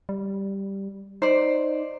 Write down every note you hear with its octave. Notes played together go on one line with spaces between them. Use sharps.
G3
D#4 C5 D5